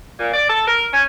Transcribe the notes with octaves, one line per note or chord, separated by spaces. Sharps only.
A#2
D5
A4
A#4
C#4